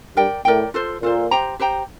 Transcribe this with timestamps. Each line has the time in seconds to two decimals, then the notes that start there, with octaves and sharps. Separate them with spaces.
0.16 G2 A#4 D5 G5
0.45 A2 A#4 D5 G5
0.74 F4 A4 C5
1.02 A#2 F4 A4 C5
1.31 G4 C5 G5 A#5
1.59 G4 C5 G5 A#5